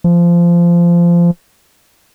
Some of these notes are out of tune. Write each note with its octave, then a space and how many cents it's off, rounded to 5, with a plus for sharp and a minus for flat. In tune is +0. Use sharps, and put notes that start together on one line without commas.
F3 -20